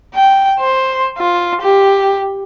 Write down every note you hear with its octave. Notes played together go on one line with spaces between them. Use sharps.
G5
C5
F4
G4